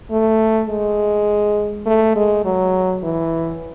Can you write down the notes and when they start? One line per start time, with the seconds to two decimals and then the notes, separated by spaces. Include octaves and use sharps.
0.11 A3
0.69 G#3
1.86 A3
2.16 G#3
2.45 F#3
3.03 E3